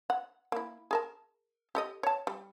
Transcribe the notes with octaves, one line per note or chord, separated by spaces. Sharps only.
F#5
A#3 E4
G#4 A#4 A5
G4 A4 D#5
C#5 A5
G3